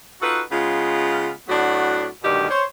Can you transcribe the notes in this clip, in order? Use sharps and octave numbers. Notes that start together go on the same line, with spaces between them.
D#4 F4 F#4 A4 B4
C#3 G#3 B3 F4
A2 F#3 B3 D4 F#4
D2 G2 B2 D#3 G4 D5
C5 C#5